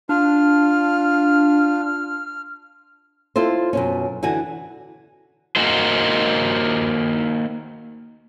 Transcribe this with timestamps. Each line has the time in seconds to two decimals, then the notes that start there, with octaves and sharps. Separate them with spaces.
0.09 D4 F4 F6
3.36 E4 F4 A4 C5
3.73 F#2 B2 C#4
4.23 D3 E3 F#4 F#5 G#5
5.56 A#3 D#4 F#4 C5